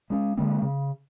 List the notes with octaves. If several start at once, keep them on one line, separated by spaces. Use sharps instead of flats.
G#3 C#4
D3 G#3 A#3 C4
C#3